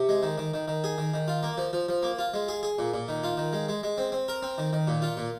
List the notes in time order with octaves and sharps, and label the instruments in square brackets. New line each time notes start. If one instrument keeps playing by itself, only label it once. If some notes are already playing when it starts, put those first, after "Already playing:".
Already playing: [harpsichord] C3
G#3
D#3
D#3
D#3
D#3
G#4
D#3
D#3
F4
A#3
F3
F3
F3
A#3
F4
G#3
G#4
G#4
A#2
A#2
D#3
F4
D#3
G#3
G#3
G#3
C4
C4
A#4
C4
D#3
D#3
A#2
F4
A#2